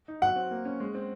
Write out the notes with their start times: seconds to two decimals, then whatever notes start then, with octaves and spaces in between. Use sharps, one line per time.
0.08 D#4
0.22 F#3 F#5
0.36 C4
0.51 A#3
0.65 C#4
0.80 G#3
0.95 C4